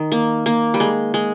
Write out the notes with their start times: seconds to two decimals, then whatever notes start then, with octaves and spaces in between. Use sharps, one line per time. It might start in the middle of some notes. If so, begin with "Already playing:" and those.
Already playing: D#3
0.12 A#3
0.46 A#3
0.74 G3
0.80 G#3
1.14 G#3